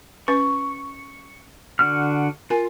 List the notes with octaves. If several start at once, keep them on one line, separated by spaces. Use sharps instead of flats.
C#4 B4 C#6
D3 F#4 F6
F4 A#4 G#5